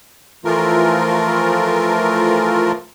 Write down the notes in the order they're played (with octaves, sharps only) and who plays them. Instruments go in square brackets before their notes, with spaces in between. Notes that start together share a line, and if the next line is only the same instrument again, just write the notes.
[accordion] E3 F3 A3 F4 A#4